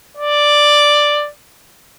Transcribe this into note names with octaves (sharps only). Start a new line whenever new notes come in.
D5